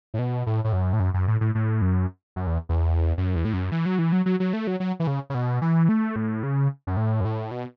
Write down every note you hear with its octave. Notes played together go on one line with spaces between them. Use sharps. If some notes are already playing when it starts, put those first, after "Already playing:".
A2
B2
A2
A2
F#2
A2
F#2
F#2
A2
A2
A2
F#2
F#2
E2
E2
F#2
E2
A2
F#2
E3
F#3
E3
F#3
F#3
F#3
A3
F#3
F#3
E3
C#3
C#3
B2
E3
A3
A2
C#3
F#2
A2
F#2
A2
B2